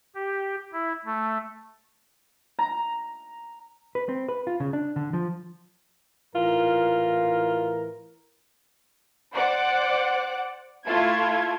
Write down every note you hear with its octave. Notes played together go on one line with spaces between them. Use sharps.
G4
E4
A3
A#5
B4
C4
B4
F4
C#3
D4
D3
F3
A2 E3 F4 A#4
C5 D5 F#5 D6
A3 E4 F4 A5 G#6